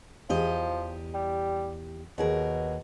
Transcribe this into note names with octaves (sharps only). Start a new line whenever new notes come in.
E2 F3 G4 D#5
G3
D#2 B2 G#4 A#4